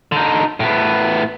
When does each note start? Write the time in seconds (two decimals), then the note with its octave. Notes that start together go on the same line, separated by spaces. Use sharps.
0.12 D3 D#4
0.60 A2 B3